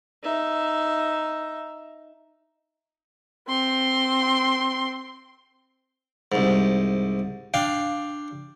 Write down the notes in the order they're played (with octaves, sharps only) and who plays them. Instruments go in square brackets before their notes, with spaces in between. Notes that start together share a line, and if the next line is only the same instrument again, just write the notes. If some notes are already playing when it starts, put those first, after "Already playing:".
[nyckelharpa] D#4 E5
[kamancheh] C4 C6
[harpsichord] C2 G#2
D4 F5 G5